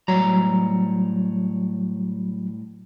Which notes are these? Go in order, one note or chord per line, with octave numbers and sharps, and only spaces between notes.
A2 F#3 G3 A#5